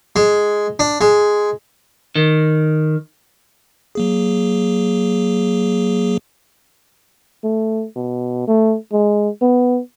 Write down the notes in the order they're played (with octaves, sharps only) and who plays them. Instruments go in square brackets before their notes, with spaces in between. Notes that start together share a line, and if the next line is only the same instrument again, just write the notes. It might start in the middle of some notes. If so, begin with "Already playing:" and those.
[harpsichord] G#3
D4
G#3
[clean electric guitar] D#3
[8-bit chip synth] F#3 A#3 G#4
[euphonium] A3
B2
A3
G#3
B3